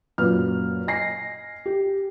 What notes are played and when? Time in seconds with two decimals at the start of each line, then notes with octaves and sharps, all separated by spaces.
0.18 F#2 A#2 B4 F6
0.87 D#5 G#5 A#6 C7
1.66 G4